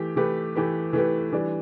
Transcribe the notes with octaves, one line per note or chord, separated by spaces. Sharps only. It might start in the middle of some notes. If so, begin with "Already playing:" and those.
Already playing: E3 A3 G4
E3 A3 G4 B4
E3 A3 G4 B4
E3 A3 G4 B4
E3 G3 D4